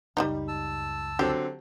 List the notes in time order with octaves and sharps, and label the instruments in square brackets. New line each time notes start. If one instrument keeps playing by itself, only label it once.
[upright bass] C#2 F#2 [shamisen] G3 D4 D#4
[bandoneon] A5 E6
[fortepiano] D3 F#3 C4 [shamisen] G4